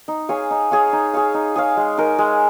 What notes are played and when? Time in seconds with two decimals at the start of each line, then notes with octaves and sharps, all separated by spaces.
0.08 D#4
0.29 G#4 C#5 F5
0.51 D#4
0.71 G#4 C#5 F5
0.93 D#4
1.13 G#4 C#5 F5
1.34 D#4
1.56 G#4 C#5 F5
1.77 G#3
1.98 D#4 A#4
2.19 G#3